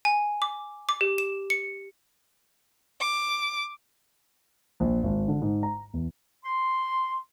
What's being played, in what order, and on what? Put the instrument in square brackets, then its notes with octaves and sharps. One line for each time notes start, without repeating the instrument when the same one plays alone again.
[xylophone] G#5
D6
D6
G4
E7
C#7
[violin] D6
[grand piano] A#1
G#1
D3
G#2
A#5
E2
[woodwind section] C6